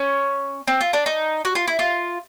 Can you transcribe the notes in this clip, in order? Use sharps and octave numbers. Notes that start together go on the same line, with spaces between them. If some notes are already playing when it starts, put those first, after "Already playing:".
Already playing: C#4
C4
F4
D4
D#4
F#4
F4
E4
F4